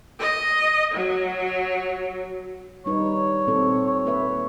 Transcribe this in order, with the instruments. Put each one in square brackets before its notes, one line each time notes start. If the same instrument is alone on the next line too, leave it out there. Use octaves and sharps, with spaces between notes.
[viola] D#5
F#3
[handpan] G3 D#4 B4 [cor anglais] C#5
[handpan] A#2 C4 A4
[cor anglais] C#5
[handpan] A#3 B4 E5